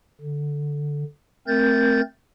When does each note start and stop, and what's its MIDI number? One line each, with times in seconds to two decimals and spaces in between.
0.21 1.04 50
1.48 2.01 57
1.48 2.01 60
1.48 2.01 70
1.48 2.01 91
1.48 2.01 93